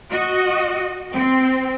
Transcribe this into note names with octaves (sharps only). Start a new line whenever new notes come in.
F#4 D#5
C4